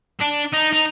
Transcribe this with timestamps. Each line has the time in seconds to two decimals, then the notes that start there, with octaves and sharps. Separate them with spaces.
0.20 D4
0.53 D#4
0.73 D#4